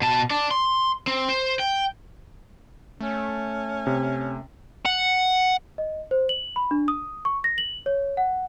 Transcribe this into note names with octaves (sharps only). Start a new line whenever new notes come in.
B2 A5
D5 A5
C6
C4
C5
G5
A3 C#4
C3
F#5
D#5
C5
F#7
B5
D4
D#6
C#6
A#6
F#7
C#5
F#5